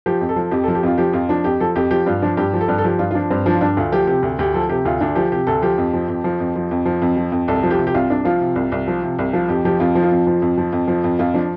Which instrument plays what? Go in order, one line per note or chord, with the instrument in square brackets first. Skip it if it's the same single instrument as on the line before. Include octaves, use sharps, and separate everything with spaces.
[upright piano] F3 G4
F2
A4
F3
F2 G4
F3 A4
G4
F2 F4
F3 G4
F2 F4
F3 D4
F2 G4
F3 A4
F2 G4
F3 G4
G2 F4
F3 D4
G2 G4
F3
A4
G2
A4
F3 G4
G2 F4
F4
F3 D4
G2 C4
F3 D4
F4
G2 D4
D2 F4
F3 G4
C3 G4
D2
D2 G4
F3 A4
C3 G4
D2 F4
D2 D4
F3 G4
C3 G4
D2 A4
F3 G4
F2
F3
F2
F3
F2
F3
F2
F3
F2
F3
F2
C2 A4
F3
G4
C3
G4
C2 F4
C2 D4
F3 F4
C3
C2
C2
F3
C3
C2
F3 F4
F2 G4
F3 G4
F2 F4
F3
F4
F2
F3
F2
F3
F2
F3
F2
F2 F4
F3 D4